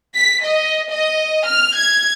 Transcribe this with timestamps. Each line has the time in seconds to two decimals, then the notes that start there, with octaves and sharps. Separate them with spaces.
0.15 B6
0.45 D#5
0.90 D#5
1.46 F6
1.76 G#6